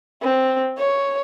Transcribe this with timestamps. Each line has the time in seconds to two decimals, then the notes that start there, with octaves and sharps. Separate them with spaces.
0.22 C4
0.78 C#5